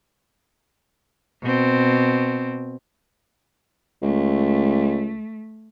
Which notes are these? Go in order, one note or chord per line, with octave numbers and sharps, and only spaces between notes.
B2 C4
C#2 A3